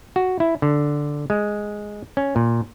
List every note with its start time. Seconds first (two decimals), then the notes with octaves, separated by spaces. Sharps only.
0.16 F#4
0.40 E4
0.62 D3
1.30 G#3
2.17 C#4
2.36 A#2